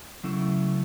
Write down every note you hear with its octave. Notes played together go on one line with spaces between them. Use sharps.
C#3 F#3 A3 C#4 E4